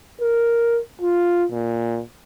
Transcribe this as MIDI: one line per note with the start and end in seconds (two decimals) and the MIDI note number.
0.21 0.80 70
1.02 1.45 65
1.52 2.01 46